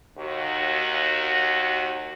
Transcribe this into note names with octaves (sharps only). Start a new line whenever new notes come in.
D#2 F#4